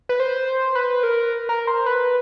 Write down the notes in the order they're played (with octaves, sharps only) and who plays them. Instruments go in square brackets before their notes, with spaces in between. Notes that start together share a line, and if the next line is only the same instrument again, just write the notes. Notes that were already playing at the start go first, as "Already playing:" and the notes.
[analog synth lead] B4
C5
B4
A#4
A#4
C5
B4